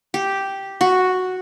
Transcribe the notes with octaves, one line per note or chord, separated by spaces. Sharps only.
G4
F#4